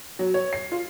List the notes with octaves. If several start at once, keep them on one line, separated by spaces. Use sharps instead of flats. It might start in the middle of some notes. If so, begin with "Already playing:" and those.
F#3
C#5
C7
F4